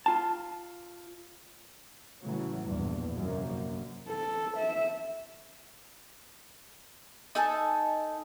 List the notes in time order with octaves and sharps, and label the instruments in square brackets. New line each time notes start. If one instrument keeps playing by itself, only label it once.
[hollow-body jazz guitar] F4 A5
[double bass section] A1 C#3 E3 F#3 A3
A#1 E2 G2
A#1 F#2 C3 A#3
[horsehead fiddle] A4
E5
[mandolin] D#4 A4 G#5 A5